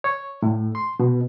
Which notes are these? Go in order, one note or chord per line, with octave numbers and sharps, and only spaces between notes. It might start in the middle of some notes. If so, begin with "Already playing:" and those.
C#5
A2
C6
B2